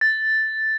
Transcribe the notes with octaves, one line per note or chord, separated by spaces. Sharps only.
A6